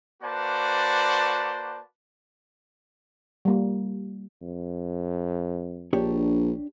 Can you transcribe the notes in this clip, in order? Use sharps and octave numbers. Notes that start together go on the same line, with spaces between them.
A#3 F#4 B4 C5 D5 A5
G3 A#3
F2
A#1 D4 G4 C#5